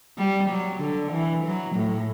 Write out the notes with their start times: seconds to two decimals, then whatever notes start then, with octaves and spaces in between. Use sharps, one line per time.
0.18 G3
0.50 F#3
0.81 D3
1.12 E3
1.44 F#3
1.76 A2